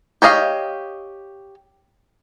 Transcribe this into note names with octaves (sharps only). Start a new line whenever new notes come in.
G4 C#5 D#5 F5